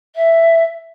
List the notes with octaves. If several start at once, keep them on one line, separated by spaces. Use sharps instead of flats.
E5